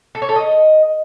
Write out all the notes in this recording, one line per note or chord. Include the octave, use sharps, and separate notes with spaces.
A4
C#5
A4
D#5